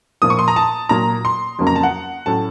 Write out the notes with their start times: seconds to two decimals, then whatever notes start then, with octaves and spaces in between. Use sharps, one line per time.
0.22 A#2 F3 A#3 D#6
0.30 C#6
0.39 C6
0.48 A#5
0.56 A5
0.89 A#2 F#3 A#3 A#5
1.25 C6
1.59 F2 C#3 F#3 A#3 C#4
1.67 A#5
1.76 A5
1.83 F#5
2.26 A2 F#3 A3 C#4 A5